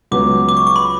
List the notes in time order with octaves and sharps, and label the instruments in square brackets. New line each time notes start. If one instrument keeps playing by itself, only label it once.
[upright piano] C#2 C#3 F#3 B3 [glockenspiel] D6
[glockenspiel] D6
C#6
C#6
B5